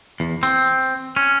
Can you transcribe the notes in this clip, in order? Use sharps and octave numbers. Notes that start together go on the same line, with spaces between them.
E2
C4
C#4